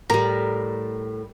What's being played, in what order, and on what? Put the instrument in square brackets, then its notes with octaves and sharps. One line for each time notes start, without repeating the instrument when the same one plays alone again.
[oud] A2 [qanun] G3 A#4 [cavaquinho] A#5